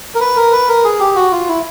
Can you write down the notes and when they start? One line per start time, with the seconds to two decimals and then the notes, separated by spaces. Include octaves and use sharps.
0.15 A#4
0.21 B4
0.36 A#4
0.52 B4
0.69 A#4
0.84 G#4
1.00 G4
1.16 F#4
1.32 F4
1.48 E4